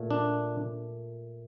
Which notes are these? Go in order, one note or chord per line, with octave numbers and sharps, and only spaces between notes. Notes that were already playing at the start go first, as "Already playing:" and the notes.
Already playing: A#2 A3
D4